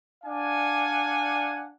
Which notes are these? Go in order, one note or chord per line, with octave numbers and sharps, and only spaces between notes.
D4 D5 F5 F#5 G#5